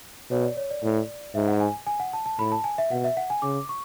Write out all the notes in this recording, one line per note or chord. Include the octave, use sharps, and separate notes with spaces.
B2 C#5
D5
C#5
D5
A2
G#2 E5
F#5
G#5
G#5
F#5
A5
A5
A2 B5
A5
G#5
E5
B2 F#5
E5
F#5
G#5
C#3 D6
C#6